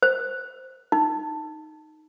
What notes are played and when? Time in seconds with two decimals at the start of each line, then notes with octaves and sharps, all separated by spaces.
0.02 C5
0.92 D#4